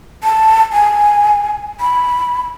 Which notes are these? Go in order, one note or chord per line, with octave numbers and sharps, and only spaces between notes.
A5
G#5
B5